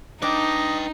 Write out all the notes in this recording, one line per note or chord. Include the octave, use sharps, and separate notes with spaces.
D4 D#4 B4 D#5 G5